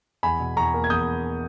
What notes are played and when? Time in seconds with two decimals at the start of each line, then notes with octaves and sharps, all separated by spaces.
0.23 E2 G#5 B5
0.40 B2
0.57 E2 A#5 C#6
0.74 A#3
0.84 G#6
0.90 E2 D#6 G6